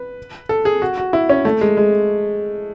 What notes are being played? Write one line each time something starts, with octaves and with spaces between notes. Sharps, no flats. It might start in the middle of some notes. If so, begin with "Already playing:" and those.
Already playing: B4
A4
G#4
F#4
F#4
E4
C#4
A3
G#3
G#3